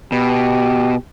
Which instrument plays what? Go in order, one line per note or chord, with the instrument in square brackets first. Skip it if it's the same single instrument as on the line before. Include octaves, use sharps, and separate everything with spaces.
[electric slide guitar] B2 [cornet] G4